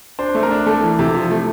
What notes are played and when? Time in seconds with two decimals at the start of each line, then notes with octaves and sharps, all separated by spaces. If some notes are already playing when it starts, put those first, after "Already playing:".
0.19 D4 C5
0.35 A3
0.43 A#4
0.51 D4
0.66 A3 A4
0.83 E3
0.99 C3
1.15 F3
1.31 A3